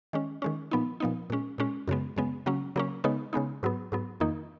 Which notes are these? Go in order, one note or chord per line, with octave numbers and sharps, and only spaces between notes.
D#3 G#3 C#4
D#3 G#3 C#4
A#2 F3 B3 D#4
A#2 F3 B3 D#4
A#2 G#3 C#4
A#2 G#3 C#4
F#2 C#3 G#3 B3
F#2 C#3 G#3 B3
C#3 F#3 A#3 C#4
C#3 F#3 A#3 C#4
C#3 G#3 B3 D#4
C#3 G#3 B3 D#4
G#2 F#3 B3
G#2 F#3 B3
F2 D#3 A#3 D#4